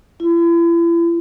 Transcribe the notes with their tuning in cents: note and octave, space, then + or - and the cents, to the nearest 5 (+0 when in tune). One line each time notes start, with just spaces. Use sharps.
E4 +40